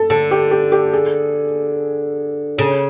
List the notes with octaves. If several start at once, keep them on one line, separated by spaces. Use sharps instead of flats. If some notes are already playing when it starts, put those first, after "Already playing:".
Already playing: A4
D3 A4
G4
G4
G4
G#4
C#3 A4